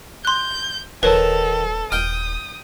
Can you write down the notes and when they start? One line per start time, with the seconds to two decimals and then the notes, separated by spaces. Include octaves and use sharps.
0.25 C6 F#6 G6
1.03 D#1 D#3 A4 B4 C#5 A5
1.92 D#1 G5 D#6 F6